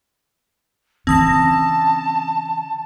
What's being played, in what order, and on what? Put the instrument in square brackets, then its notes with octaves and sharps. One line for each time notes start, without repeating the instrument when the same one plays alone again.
[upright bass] C#3 E3 [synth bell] C4 D#6 A#6 [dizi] A5